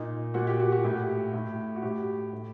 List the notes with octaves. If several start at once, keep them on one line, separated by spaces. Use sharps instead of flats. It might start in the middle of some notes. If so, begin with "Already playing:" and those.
Already playing: A#2 D#4
A#2 F#4
G4
F#4
F#4
A2 G4
A2
F#4
A2 G4
A2